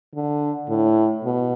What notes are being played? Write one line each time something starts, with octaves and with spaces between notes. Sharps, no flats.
D3
A2
B2